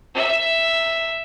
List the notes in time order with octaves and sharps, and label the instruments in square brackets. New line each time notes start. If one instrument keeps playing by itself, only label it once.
[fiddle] E5